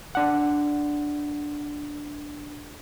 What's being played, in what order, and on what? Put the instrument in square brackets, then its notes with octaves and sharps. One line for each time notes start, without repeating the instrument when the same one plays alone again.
[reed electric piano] D4 F#5